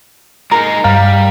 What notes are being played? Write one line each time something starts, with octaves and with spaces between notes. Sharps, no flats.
G#3 D#4 A#4
G2 G3 F5 A#5